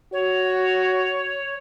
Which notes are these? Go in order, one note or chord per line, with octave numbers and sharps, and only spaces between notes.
F#4 C#5